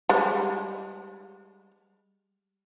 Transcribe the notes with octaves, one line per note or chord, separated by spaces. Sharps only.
G3 G#3